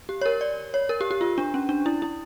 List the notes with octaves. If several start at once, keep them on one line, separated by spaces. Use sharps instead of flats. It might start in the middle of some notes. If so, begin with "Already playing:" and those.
G4
C#5
A#4
D5
C#5
A#4
G4
G4
F4
D4
C#4
D4
E4
E4